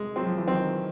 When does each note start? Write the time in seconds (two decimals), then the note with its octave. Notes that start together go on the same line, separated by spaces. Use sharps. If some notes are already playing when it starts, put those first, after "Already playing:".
Already playing: C3 G#3
0.16 F#3 C4
0.26 F3
0.37 E3
0.47 D#3 F3 C4